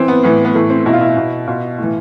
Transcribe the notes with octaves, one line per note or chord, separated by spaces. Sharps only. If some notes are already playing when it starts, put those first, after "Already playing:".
Already playing: E3 C4
B3
A2 E3 B3
B3
A2 E3 A3
C4
B2 E4
F4
E4
B2
B2 F4
A2 E3